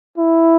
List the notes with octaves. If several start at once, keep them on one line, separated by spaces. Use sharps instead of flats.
E4